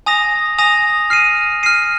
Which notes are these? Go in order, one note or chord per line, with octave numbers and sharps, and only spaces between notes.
G#5 D#6 A#6 F7
G#5 D#6 A#6 F7
F6 C7 D#7
F6 C7 D#7